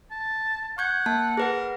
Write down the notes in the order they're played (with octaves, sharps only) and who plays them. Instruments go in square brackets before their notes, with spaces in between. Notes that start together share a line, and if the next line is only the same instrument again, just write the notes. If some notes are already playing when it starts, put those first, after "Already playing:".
[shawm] A5
[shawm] F#5 [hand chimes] C#6 G6 G#6
[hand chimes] A#3 A5
[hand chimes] G#4 B4 F#5 [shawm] A#4